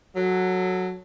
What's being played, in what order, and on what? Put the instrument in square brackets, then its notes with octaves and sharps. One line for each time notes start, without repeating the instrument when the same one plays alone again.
[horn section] F#3 A4